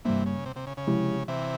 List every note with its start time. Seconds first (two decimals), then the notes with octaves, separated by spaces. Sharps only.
0.05 G2 C3 E3 G3 A#3
0.26 C#3
0.46 C3
0.56 C3
0.67 C#3
0.77 C#3
0.87 C3 F3 G#3 E4 G4
1.28 C3 E3